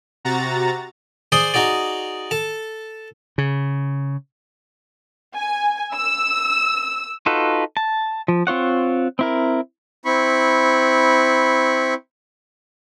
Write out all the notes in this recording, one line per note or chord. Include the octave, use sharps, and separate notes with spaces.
C3 F#4 A#5 A6
G#4 C5 D5 C6 D#6
D#4 F#4 G#4 D5
A4 A5
C#3
G#5
E6
D#4 F4 F#4 A4 B4
A5
F3
C4 F4 C#5 F#5
C4 E4 A#4
C4 E4 B5 C#6